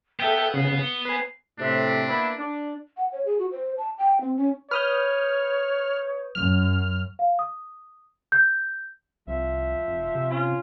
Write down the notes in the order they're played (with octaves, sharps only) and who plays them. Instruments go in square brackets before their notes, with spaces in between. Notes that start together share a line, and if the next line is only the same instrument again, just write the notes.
[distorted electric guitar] B3 [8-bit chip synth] A4 E5 G5 [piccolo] G7
[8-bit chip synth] C#3 [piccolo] C7
[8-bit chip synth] C#7 [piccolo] G7
[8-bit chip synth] B4 G#5 [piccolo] C7
[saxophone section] A2 C3 [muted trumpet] D4
[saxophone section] A#3 B3 E4
D4
[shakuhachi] F#5
C#5
G#4
F#4
C5
A5
G5
C4
C#4
[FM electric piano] B4 D#6 G6 [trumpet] C#5 [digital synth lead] F6
[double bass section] F#2 [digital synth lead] F6
[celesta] F5
D#6
G6
[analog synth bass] C2 [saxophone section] F3 E5
[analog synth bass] F1
C3
[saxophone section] C#4 F4